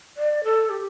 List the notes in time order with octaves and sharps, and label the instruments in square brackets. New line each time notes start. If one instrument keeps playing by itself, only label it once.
[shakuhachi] D5
A4
G4